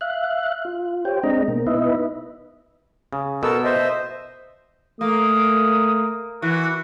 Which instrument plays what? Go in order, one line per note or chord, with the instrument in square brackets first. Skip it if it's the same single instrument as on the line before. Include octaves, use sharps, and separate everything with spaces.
[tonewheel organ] E5 F5 F#6
F4
G4 C5 C#5 G5
G#3 C4 D4 D#5 A#5
B2 A#3
B3 D#4 E4 B4 D#5 E5
[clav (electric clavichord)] C#3
[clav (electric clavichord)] B2 [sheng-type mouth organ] A4 A#4 E6
[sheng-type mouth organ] C5 D#5 E5
[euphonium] A3 [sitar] A#3 [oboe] D#6
[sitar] E3 [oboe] F#4